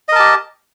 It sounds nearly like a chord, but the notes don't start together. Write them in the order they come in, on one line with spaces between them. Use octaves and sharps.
D#5 A#4 A5 G4